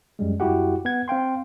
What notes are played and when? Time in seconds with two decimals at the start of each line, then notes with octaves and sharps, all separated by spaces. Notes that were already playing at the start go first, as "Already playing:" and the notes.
0.19 F#2 G3 G#3
0.40 F#2 G3 E4 F#4 G4 F#5
0.85 B3 F#5 G#6
1.08 C4 F5 G5 C6